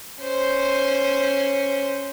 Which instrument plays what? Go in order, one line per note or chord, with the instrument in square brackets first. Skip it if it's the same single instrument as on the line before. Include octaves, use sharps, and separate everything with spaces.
[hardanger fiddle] C#4 C5